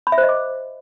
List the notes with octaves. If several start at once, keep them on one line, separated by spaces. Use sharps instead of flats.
B5
E5
C5
D#5
D6